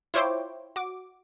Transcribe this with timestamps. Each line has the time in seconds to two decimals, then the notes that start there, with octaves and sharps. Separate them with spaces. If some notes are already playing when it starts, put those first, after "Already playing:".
0.14 E4 F4 C5 C#5 G5 D6
0.76 F#4 D6